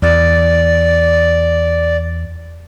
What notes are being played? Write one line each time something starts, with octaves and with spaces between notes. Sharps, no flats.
E2 D5